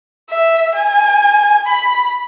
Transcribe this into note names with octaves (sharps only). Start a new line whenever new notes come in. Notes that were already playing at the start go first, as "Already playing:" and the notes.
E5
G#5
B5